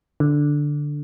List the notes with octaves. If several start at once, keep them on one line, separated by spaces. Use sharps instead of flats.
D3